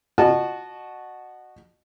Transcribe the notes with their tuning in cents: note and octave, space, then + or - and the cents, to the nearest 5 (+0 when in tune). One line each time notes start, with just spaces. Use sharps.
F#4 +0 D#5 -35 A5 -15